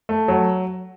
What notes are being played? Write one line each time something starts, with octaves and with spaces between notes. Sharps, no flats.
A3
F#3